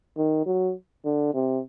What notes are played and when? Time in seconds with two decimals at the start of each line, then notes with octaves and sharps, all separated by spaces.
0.17 D#3
0.46 F#3
1.05 D3
1.34 C3